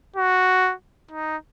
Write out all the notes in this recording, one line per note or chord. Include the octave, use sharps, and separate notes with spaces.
F#4
D#4